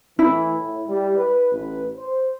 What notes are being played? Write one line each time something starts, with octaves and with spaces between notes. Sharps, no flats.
A2 E3 E4
A2
G3
B4
A1 B4
C5